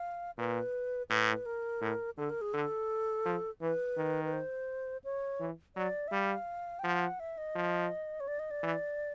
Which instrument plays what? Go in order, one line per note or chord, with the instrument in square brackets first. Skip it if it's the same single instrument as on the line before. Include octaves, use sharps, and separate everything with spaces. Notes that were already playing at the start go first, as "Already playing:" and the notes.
Already playing: [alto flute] F5
[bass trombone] A#2 [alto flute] B4
[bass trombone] A2 [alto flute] B4
[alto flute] A#4
[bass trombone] A2
[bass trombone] D3 [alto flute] A4
[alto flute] A#4
G#4
[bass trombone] D3 [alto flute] A4
[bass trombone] F3
[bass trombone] E3 [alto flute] B4
[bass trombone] D#3
[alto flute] B4
C5
C#5
[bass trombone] E3
[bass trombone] F#3 [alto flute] D5
[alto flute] E5
[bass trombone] G3 [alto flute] F5
[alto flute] G5
[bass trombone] F3 [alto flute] F#5
[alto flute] E5
D#5
[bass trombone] F3
[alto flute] C#5
D5
D#5
D5
[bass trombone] E3